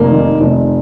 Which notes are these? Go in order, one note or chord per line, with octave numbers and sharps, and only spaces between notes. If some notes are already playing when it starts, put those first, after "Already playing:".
Already playing: F1 A#3
D#3
F1